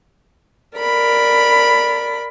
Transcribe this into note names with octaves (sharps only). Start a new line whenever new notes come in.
A#4 D5 B5